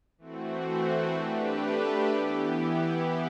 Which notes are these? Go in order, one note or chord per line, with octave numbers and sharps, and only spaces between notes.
E3 A3 C4 F#4
A3 D4 G4 B4
E3 B3 E4 G4